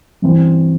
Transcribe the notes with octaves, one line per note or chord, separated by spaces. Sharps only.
G2 E3 C4